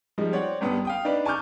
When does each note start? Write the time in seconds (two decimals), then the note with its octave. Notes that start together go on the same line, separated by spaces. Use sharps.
0.18 F3 G3 G#3 D#4
0.32 C4 C#5 D5 F#5
0.61 G#1 G2 B3 G4 D#6
0.85 F5 G5 D#6
1.05 D4 D#4 B4 D5 B5
1.25 G#5 A5 C#6 D6 F6 G6